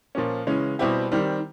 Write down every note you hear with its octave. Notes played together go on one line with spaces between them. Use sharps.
A#2 F3 A#3 C#4
C#3 E3 G#3 C#4
B2 G3 C4 E4 G4
D#3 G3 C4